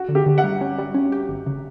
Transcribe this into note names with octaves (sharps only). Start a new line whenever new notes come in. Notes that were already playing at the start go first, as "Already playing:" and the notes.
Already playing: F#4
D3
G4
D3
F#5
G3
C#4
G3
C#4
G4
G1
C#3